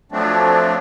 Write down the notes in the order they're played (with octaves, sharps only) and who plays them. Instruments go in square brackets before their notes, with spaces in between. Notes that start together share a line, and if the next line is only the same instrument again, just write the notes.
[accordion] F3 F#3 A3 C4 D4